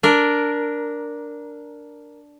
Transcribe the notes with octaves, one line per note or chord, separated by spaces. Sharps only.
D4 A#4